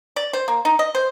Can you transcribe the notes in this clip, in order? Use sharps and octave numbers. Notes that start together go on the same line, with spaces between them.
D5
C5
A#3
D#4
D#5
C5